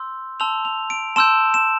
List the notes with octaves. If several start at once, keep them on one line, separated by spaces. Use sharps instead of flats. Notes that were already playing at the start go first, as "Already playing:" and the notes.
Already playing: C6 E6 G6
A5 C6 E6 G6 F7
F7
D7
A5 C6 E6 G6 E7
E7